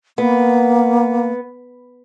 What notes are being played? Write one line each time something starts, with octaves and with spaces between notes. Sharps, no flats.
A#3 B3